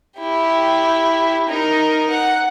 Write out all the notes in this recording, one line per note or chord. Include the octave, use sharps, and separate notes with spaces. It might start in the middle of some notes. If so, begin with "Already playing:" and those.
E4 G4
D#4 A#4
F#5